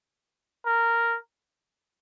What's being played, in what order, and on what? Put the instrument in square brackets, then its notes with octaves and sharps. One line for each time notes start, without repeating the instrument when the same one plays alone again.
[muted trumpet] A#4